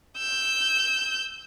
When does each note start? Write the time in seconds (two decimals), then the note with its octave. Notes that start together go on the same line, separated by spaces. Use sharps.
0.18 E6 G6